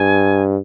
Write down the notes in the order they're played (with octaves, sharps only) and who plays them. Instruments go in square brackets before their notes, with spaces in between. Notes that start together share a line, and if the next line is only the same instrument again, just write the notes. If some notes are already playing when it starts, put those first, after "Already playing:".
Already playing: [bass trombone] G2 [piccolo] G#5